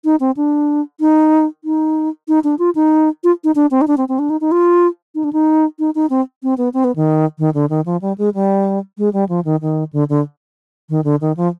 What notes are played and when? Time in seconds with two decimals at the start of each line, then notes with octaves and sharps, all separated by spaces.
0.04 D#4
0.20 C4
0.37 D4
1.00 D#4
1.64 D#4
2.28 D#4
2.44 D4
2.59 F4
2.75 D#4
3.24 F4
3.44 D#4
3.55 D4
3.71 C4
3.81 D#4
3.87 D4
3.97 C4
4.09 C4
4.19 D4
4.30 D#4
4.41 D#4
4.51 F4
5.15 D#4
5.24 D4
5.33 D#4
5.79 D#4
5.95 D#4
6.10 C4
6.43 C4
6.58 B3
6.74 C4
6.84 B3
6.96 D#3
7.39 D#3
7.54 D3
7.70 D#3
7.86 F3
8.02 G3
8.18 G#3
8.34 G3
8.98 G#3
9.13 G3
9.29 F3
9.45 D#3
9.62 D#3
9.93 D3
10.09 D3
10.89 D#3
11.04 D3
11.21 D#3
11.37 F3